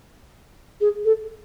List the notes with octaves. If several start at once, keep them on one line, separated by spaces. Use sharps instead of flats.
G#4
A4